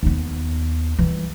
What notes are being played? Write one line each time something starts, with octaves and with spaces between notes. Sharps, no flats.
D#2 B3
E3 G3